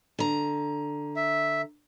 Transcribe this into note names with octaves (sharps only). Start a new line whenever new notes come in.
D3 A#5
E5